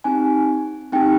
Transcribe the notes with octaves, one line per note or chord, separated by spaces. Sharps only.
C4 D#4 G4 G#5
C4 D#4 G4 G5